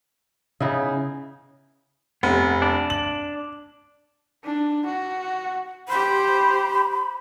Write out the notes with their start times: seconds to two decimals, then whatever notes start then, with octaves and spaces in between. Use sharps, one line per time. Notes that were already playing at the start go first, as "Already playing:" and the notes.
0.60 C#3 B3 D#4 E4
2.23 F1 B3
2.62 D4
2.90 F#7
4.44 D4
4.86 F#4
5.89 G4 C5 B5